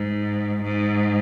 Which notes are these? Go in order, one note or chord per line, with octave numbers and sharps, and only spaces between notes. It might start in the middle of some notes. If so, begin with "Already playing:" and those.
Already playing: G#2
G#2